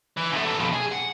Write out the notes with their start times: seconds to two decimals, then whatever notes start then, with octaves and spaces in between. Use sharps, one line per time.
0.17 E3
0.32 F#2 A3
0.46 E3 A4
0.59 F2 B2
0.72 G#4
0.92 F#5